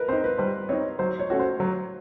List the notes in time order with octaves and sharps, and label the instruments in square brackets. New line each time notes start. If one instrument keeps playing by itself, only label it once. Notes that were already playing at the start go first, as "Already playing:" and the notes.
Already playing: [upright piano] A#4 B4
[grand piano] C4 D#4 [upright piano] C5
[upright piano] B4
[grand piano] G3 [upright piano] C5
[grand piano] C4 D#4 [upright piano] C#5
[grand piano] F#3 [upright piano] C5
[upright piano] C#5
[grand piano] A3 C#4 F#4
[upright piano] C5
[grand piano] F#3